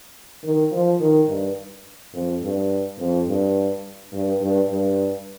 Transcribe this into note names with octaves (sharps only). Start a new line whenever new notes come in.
D#3
F3
D#3
G2
F2
G2
F2
G2
G2
G2
G2